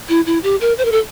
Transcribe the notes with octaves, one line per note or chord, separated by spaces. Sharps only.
E4
E4
G4
A#4
C5
A#4
A4